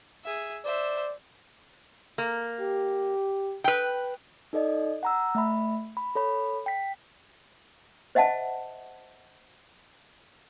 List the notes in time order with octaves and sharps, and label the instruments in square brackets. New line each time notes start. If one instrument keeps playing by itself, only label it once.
[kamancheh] G#4 E5
[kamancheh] C5 E5 [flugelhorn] D5
[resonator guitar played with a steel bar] A#3
[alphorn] G4
[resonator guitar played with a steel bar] B4 G5
[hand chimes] D#4 A4 D5 D#5
F#5 A#5 E6
A3 E5 B5
B5
A4 C#5 B5
G5 B6
[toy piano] C5 D#5 E5 F#5 A5